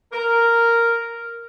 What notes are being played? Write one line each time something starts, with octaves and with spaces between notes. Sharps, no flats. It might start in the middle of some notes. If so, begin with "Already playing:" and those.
A#4